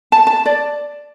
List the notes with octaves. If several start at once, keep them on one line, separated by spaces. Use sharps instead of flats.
A5
A5
D5